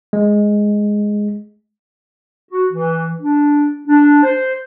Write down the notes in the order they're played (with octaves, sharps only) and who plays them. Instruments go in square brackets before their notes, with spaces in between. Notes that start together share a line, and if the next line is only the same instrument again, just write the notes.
[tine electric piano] G#3
[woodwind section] F#4
E3
D4
D4
C5